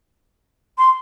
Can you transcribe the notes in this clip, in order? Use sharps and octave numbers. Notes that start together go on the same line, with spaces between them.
C6